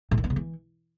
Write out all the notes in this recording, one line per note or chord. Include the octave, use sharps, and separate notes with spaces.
A2
D#3
B3
C#3
E3